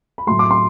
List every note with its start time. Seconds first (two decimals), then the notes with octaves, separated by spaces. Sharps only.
0.18 B5
0.27 A2 F#3 A3 C6
0.39 D6
0.51 C6